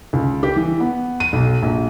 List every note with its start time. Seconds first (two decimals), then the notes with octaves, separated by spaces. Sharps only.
0.13 C#2
0.43 G4
0.56 E3
0.80 B3
1.20 D#7
1.33 B1
1.63 A#1